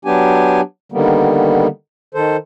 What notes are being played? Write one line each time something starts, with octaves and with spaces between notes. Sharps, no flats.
F#3 B3 D4 G4 G#5
D3 D#3 G3 A#3 B3
D#3 A4 C5